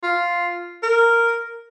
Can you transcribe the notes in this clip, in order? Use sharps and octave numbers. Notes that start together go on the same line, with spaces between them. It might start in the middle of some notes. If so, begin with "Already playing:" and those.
F4
A#4